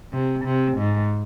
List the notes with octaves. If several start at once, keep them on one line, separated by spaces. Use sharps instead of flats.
C3
C3
G#2